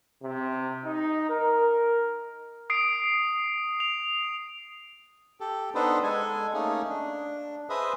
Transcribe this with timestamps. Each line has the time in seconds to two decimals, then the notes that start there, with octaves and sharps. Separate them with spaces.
0.23 C3
0.85 D#4
1.29 A#4
2.70 D#6 C7 D7
3.80 F7
5.41 G4 A4
5.75 B3 D4 D#4 A4 B4 C5
6.03 G#3 A4 G#5
6.54 A3 A#3 C#4 D#4 G#4
6.89 D4
7.70 G#4 B4 C5 D#5 E5 D#6